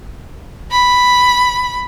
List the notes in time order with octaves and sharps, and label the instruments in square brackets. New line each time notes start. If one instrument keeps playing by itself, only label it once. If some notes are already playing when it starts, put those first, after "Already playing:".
[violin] B5